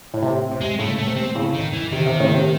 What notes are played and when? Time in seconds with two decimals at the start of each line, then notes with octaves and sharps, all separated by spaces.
0.14 A2
0.23 C3
0.51 C3
0.61 G#3
0.79 A2 C#3 A3
0.98 A3
1.07 C3
1.16 C4
1.35 A2 C#3
1.54 D#3
1.74 E3
1.92 C3 D#3
2.06 C3
2.20 A2 C#3
2.34 C3